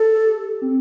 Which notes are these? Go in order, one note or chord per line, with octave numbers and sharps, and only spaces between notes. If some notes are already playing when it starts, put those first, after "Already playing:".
Already playing: A4
G4
C4